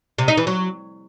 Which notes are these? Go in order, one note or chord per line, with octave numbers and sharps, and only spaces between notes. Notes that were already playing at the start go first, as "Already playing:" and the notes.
C3
D#4
E3
F#3